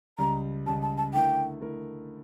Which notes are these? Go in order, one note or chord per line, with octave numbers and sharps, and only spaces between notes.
C#2 C#3 G3 A#5
C#2 C#3 G3 A5
A5
A5
D3 A3 E4 A#4 G5
D3 A3 E4 A#4